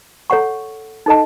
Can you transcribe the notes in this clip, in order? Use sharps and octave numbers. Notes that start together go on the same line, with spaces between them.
A4 C#5 F#5 C#6
D#4 A4 D#5 A5